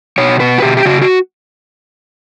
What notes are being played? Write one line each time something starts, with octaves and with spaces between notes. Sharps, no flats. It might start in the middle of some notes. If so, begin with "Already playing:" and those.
B2 C#5
B2 B4
F#4
B2 G4
G4
C#3 F#4
F#4